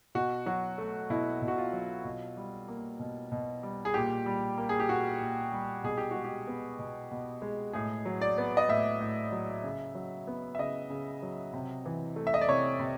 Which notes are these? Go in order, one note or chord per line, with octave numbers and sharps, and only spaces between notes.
B2 F#4
F#3 F#4
A3
B2 E4
B2
F#4
F4
F#3
B2
G3
A#3
B2
B2
G3
G#4
A#2 G4
G3
A#3
G#4
G4
A#2 F#4
A#2
G3
B2 G#4
G4
F#4
G#3
G4
B3
B2
B2
G#3
A2 G#4
F#3
D5
B3
D#5
A2 E5
A2
F#3
C#3
F#3
B3
E5
C#3 D#5
C#3
F#3
C3
E3
A3
E5
D#5
D5
C3 C#5
C3